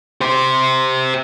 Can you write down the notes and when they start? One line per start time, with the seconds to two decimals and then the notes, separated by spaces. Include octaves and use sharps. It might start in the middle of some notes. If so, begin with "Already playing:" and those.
0.21 G4 C5